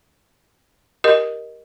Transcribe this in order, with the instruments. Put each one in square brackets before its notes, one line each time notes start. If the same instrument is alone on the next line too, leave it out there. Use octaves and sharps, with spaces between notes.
[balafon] G4 A#4 D#5